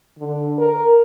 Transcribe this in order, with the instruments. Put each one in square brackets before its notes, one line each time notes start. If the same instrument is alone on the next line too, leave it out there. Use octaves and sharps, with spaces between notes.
[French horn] D3
A#4